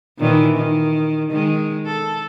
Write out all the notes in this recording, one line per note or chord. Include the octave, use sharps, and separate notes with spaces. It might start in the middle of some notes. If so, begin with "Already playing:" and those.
A#2 D#3 E3
D#3
D#3 G#3
A4